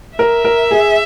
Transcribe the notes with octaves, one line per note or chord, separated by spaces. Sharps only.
A#4 E5
A#4
G#4